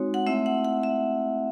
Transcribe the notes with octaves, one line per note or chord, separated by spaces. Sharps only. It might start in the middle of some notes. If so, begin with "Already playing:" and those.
Already playing: G#3 C4 D#4 F#4 C#5
F#5
A3 C4 E4 E5
F#5
F#5
E5